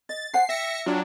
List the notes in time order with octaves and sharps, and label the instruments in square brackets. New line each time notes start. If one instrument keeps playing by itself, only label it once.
[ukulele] D#5 [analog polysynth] A6
[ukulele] C5 F#5 G#5 [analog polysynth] C7
[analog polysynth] E5 A#6 C#7 [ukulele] G5
[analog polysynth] F#3 D4 [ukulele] F4 F#4 G5